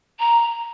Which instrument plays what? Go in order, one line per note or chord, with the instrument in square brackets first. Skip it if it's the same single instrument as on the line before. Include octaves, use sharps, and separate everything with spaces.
[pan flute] A#5